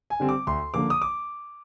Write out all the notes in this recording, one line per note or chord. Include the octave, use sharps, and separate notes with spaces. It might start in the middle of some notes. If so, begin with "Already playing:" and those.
G#5
D3 G3 C4
D6
D2 C6
D3 F3 A#3 D6
D#6
D6